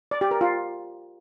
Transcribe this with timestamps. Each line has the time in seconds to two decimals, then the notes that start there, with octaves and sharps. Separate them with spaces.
0.11 D5
0.21 G4
0.31 A#4
0.41 F4